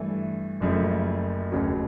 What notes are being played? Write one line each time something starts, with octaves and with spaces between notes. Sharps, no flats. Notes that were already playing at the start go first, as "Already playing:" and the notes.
Already playing: G2 E3 A3
F#1 F#2 C#3 F3 A3
F1 D#2 C#3 F#3